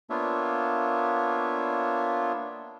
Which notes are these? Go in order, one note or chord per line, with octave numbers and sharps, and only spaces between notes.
A#3 B3 D4 F4 C#5 E5